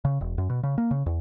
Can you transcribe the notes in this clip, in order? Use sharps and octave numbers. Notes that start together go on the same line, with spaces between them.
C#3
E1
F#2
B2
C#3
A#3
C#3
E2